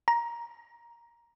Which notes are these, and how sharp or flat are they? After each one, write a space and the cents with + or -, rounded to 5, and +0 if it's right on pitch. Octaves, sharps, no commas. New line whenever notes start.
A#5 +10